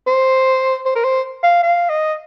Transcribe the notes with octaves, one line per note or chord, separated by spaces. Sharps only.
C5
C5
A#4
C5
F5
F5
D#5